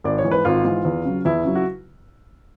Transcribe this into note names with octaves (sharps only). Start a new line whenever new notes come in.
G#1 D5
C#5
G#2 E3
B4
G#1 F4
G#2 E3
E2
C#3 F#3
E2 E4
C#3 F#3
F#4